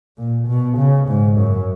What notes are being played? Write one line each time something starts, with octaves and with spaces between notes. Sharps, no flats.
A#2
B2
C#3
G#2
F#2